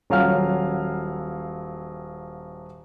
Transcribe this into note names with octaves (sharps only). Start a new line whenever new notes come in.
D#1 F#3 F5 G#5 F6